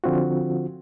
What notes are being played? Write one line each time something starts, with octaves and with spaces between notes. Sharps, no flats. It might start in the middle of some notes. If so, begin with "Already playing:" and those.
D3 F3 C4 F4 F#4